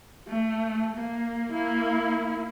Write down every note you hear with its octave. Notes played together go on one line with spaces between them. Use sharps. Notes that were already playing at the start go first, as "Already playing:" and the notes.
A3
A#3
A#3 E4